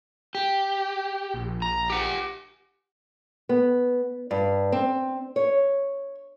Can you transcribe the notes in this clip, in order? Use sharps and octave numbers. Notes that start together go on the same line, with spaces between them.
G4
A#1
A#5
G4 F#5
B3
G2
C4
C#5